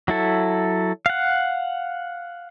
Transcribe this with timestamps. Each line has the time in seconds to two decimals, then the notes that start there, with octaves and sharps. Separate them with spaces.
0.08 F#3 E4 A4
1.06 F5 F#5